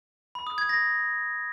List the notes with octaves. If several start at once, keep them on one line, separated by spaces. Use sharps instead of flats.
B5
D#6
G#6
A#6